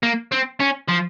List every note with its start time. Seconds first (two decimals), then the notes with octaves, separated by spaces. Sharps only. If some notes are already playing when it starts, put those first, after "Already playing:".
0.03 A#3
0.32 C4
0.60 C#4
0.89 F3